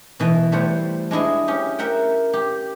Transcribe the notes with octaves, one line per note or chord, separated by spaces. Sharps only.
B2 E3
G3 A3 E4 C5 C#5 F#5
G#3 D4 E4 D#5
C#4 G4
A#4 E5 F#5 G5
G4